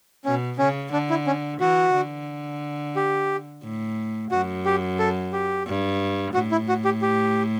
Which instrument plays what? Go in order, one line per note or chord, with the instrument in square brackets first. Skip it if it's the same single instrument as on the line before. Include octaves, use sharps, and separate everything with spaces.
[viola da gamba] B2 [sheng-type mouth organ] C#4
[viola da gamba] C#3 [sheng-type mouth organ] C#4
[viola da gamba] D3 [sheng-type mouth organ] D4
[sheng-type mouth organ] E4
C#4
[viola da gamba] E3 [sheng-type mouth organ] F#4
[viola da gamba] D3
[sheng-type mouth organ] G4
[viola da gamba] A2
[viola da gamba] F#2 [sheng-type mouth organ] F#4
[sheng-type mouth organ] G4
A4
G4
[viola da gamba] G2
[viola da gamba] A2 [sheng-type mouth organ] F#4
[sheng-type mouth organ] E4
F#4
G4
G4